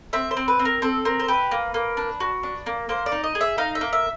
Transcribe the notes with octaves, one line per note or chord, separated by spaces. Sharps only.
C4 E5
C5
C4
B4
C4
A#4
C4 A4
C4 A#4
C5
G4 B4
A#3
A#3
D4
F#4
D4
A#3
A#3 C5
D5
D#4
D#5
G#4
E5
D#4 F5
E5
A#3
E5